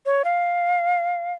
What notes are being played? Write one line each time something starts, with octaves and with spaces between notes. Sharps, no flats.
C#5
F5